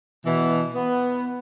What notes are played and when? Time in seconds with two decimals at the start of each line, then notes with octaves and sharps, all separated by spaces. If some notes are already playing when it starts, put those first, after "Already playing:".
0.25 B2 E3
0.74 B3